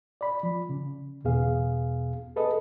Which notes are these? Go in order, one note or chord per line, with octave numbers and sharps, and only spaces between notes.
D5 B5
F3
C#3
E2 B2 B3 G#4 F5
G#4 A4 B4 D#5